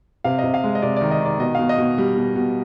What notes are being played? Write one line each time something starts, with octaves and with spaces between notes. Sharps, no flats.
C3 F5
D#5
C3
F5
G#3
D#5
C3 D5
D#3 D5
D#5
D#3 D5
B2 D#5
B2 F5
D#5
B2
G3
B2
B2